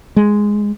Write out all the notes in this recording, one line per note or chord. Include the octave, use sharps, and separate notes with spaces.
G#3